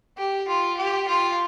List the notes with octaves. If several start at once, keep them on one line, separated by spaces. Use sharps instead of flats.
G4
F4
G4
F4